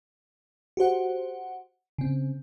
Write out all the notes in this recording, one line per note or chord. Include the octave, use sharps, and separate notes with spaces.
F#4 G4 C5 F#5
C#3 C4